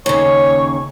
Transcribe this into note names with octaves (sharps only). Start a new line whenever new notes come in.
D#2 C#3 C#5 C#6